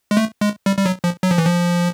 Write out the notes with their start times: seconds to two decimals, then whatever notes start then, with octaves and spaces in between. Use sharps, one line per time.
0.11 G#3
0.17 A3
0.41 G#3
0.66 G3
0.77 G3
0.86 F#3
1.04 F3
1.23 F#3
1.31 F3
1.38 E3
1.45 F3